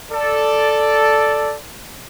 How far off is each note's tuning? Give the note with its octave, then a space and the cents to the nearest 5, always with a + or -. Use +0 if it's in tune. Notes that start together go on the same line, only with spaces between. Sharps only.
A4 +0 D5 +0